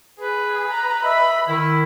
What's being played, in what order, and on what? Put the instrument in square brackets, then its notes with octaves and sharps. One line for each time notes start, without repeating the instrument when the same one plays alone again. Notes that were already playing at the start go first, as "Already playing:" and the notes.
[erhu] G#4 [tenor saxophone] B4
[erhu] A#5
[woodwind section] D#5 E5 [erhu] B5
[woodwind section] D#3 E4